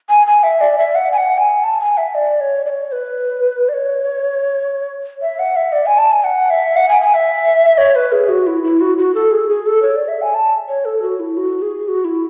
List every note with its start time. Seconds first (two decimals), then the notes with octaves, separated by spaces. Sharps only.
0.09 G#5
0.27 G#5
0.43 E5
0.61 D5
0.78 E5
0.95 F#5
1.13 G#5
1.17 F#5
1.38 G#5
1.64 A5
1.80 G#5
1.97 E5
2.15 D5
2.41 C#5
2.66 D5
2.69 C#5
2.92 B4
3.69 D5
3.73 C#5
5.22 E5
5.39 F#5
5.56 E5
5.73 D5
5.86 G#5
5.98 A5
6.12 G#5
6.24 F#5
6.50 E5
6.76 F#5
6.89 G#5
7.02 G#5
7.14 E5
7.78 C#5
7.96 B4
8.12 G#4
8.29 F#4
8.47 E4
8.64 E4
8.81 F#4
8.98 F#4
9.15 A4
9.31 G#4
9.49 G#4
9.66 A4
9.82 C#5
9.96 D5
10.08 E5
10.22 G#5
10.34 A5
10.68 C#5
10.85 A4
11.02 F#4
11.20 E4
11.37 F#4
11.62 G#4
11.88 F#4
12.05 E4